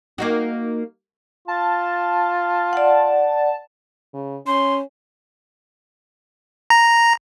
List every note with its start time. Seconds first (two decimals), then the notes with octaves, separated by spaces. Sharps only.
0.18 A#3 D#4 F#4
1.48 F4 A5
2.73 D5 F#5
4.14 C#3
4.47 C#4 C6
6.70 A#5